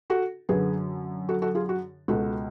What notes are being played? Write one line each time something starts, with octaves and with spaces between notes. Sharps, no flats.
F#4 A4
F#2 D3 G#4 B4
F#4 A4
F#4 A4
F4 G#4
F#4
C#2 B2 F#4 A4